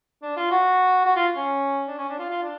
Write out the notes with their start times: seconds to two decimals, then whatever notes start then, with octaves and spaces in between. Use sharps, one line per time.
0.22 D4
0.37 F4
0.51 F#4
1.06 F#4
1.16 F4
1.36 C#4
1.88 D4
1.98 C#4
2.09 D4
2.19 F4
2.29 F4
2.43 D4